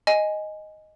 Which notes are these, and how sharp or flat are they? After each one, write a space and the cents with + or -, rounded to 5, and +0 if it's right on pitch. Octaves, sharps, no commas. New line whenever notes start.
D#5 +0 G#5 +0